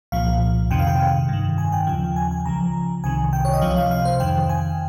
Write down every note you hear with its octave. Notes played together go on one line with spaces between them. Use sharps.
C2 A#2 F3 F5
F2 C3 D#3 G5
F5
G5
G2 D#3
G#5
G5
D#2 C#3 F3 G5
G#5
G#5
C#2 C#3 F3 A#5
C2 C3 D#3 G#5
G5
C#5
D#5
C#2 C3 F3 F5
F5
F5
C5
F2 D#3 G5
G#5